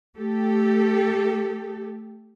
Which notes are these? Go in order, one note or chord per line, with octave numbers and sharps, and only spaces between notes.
A3 G4 A4